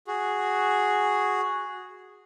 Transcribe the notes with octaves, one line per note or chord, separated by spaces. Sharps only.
F#4 G#4